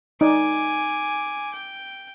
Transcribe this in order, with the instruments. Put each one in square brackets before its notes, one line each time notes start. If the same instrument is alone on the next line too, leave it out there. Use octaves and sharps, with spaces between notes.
[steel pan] D#4 D5 [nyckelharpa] G#5 D6
[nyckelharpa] G5